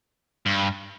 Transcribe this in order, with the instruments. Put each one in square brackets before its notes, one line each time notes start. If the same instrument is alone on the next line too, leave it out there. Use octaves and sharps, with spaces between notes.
[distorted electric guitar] G2